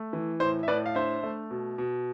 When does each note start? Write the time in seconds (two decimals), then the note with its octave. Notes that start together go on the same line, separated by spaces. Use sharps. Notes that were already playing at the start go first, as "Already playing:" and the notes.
Already playing: A3
0.13 E3
0.40 A2 C5
0.63 E5
0.68 A2 B4 D5
0.86 F5
0.95 D4 C5 E5
1.23 A3
1.51 B2
1.78 B2